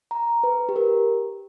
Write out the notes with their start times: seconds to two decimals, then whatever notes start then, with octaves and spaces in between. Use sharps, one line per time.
0.11 A#5
0.44 B4
0.69 G4
0.76 A#4